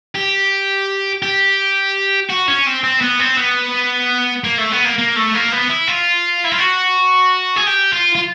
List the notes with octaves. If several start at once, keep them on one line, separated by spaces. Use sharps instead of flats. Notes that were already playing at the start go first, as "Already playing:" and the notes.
G4
G4
F#4
C#4
C4
C4
B3
C4
B3
A#3
A3
B3
A#3
A#3
A3
A#3
B3
E4
F4
E4
F4
F#4
G#4
G4
F4
F4